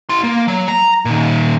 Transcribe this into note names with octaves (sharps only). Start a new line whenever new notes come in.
E4 C6
A#3
F#3
A#5
A#2 D#3